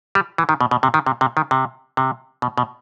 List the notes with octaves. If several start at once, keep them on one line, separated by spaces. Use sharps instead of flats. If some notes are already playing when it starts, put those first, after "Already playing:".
G3
E3
D#3
B2
B2
C3
D#3
C3
C3
D#3
C3
C3
B2
B2